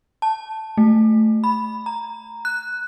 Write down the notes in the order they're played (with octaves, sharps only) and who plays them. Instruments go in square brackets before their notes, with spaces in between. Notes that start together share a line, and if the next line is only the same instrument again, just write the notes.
[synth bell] A5
A3
B5
A#5
F#6